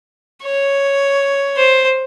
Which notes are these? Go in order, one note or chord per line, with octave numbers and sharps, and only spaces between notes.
C#5
C5